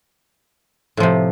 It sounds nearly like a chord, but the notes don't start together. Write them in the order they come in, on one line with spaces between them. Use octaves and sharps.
A2 F3 C3